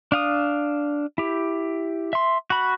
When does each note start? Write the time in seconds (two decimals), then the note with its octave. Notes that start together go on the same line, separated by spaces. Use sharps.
0.12 D4 F5 D#6
1.18 E4 G4
2.13 E5 C6
2.50 F#4 B5